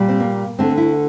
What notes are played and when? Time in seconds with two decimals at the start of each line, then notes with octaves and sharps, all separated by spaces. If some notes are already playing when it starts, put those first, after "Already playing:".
Already playing: A#2 G3
0.08 C4
0.20 A#3
0.59 D2 D3 A3 C4
0.78 E4